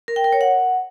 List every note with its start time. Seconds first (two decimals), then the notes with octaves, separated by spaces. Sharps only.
0.08 A#4
0.16 G5
0.24 A#4
0.33 C#5
0.41 F#5